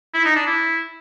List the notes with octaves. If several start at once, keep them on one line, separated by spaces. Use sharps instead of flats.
E4
D#4
D4
E4